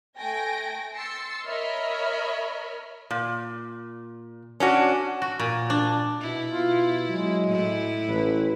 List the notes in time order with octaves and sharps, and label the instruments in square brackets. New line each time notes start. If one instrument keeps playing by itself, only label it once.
[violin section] A3 G5 G#5 A#6 D7
C6 E6 A6 C7 C#7
A#4 C#5 D#5 E5 B5 F6
[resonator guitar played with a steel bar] A#2
C#4 D4 F#4
[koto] F#4
A#2
D4
[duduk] B2 [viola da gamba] E4
[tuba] B2 [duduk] F4
[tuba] F#3 [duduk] G#3
[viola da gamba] A2 E4
[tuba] A1 [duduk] B4